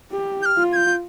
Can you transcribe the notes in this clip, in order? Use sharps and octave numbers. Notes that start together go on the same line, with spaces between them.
G4
G6
F6
F4
G#6
G6